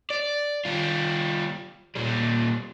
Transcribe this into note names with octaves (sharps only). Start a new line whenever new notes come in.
D5
G3 F4
A#2 G3